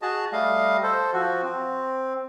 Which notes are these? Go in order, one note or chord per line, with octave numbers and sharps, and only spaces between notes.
F#4 G#4 D#5 A5
G3 A3 D#5 F5
A4 C5
F3 F#4
C4